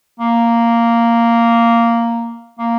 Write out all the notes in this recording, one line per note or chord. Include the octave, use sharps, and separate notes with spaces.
A#3
A#3